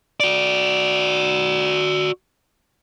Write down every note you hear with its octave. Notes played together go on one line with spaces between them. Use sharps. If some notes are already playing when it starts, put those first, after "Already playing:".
F#4 D5